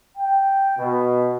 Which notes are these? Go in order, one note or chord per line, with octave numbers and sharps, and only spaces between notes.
G5
B2